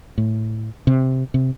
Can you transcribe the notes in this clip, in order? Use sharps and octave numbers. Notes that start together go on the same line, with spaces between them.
A2
C3
C3